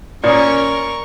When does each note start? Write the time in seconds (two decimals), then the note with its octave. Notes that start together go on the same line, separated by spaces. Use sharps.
0.24 A#2 C#4 A#4 D5 B5 C#6 D#6